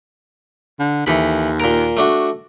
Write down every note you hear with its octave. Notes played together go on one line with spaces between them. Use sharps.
D3
D#2 E3 A4 B5
A#2 A#4
A3 D4 F#4